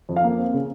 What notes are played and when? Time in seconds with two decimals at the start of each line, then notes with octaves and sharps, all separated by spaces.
0.09 F2
0.16 F5
0.24 A#3
0.38 C4
0.54 C#3